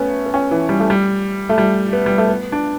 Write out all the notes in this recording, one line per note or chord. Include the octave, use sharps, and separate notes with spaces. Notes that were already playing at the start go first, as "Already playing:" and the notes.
Already playing: A3 B3 C#4
B3
C#4
E3
G3
A3
G3
A3
G3
B3
G3
A3
B3
D4